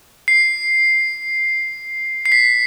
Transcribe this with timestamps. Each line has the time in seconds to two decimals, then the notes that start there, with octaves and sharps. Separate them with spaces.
0.28 C7
2.26 C7
2.32 B6